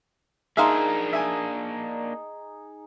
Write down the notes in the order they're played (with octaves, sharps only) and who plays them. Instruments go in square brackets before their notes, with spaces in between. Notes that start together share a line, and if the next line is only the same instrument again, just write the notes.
[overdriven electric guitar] A#3 D4 [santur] D#4 G#4 [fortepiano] E5 F5 C6
[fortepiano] E5 G#5